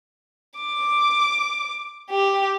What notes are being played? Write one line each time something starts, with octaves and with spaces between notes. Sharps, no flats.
D6
G4